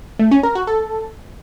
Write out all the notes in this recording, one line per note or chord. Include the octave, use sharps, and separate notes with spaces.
A3
C#4
A#4
F#4
A4